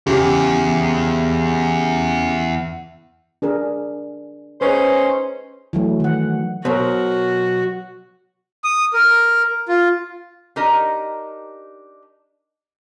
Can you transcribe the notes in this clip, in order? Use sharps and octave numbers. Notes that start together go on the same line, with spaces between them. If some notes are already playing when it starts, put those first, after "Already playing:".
E2 C#3 G4
D4 G#4 A#4
C#4 D#4 G#4 B4 C5
E3 F#3 A3
D#3 F#5
B2 F#3 F#4 A#4 C5
D#6
A#4
F4
D4 D#4 G4 A#4 D#5